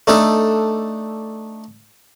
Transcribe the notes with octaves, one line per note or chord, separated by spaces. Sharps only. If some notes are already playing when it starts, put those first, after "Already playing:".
A3 D4 D#4 A4